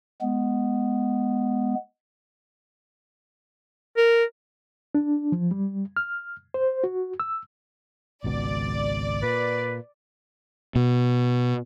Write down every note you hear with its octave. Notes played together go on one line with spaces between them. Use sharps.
G#3 B3
A#4
D4
F3
G3
F6
C5
F#4
E6
G#1 C#2 B2 D5
A#2 B4
B2